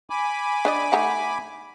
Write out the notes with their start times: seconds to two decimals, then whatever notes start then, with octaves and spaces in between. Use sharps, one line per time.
0.10 G#5 B5 D6
0.65 D4 D5 D#5
0.92 A3 D#4 F#5